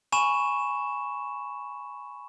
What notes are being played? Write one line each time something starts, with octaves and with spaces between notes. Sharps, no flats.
G#5 B5 C#6 E7